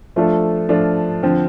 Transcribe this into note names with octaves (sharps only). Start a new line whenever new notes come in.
F3 A3 D4 F4 A4
F3 A3 D4 F4 A4
D3 F3 C4